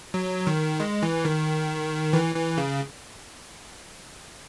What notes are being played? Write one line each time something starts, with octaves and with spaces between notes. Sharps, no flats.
F#3
D#3
G#3
E3
D#3
E3
E3
C#3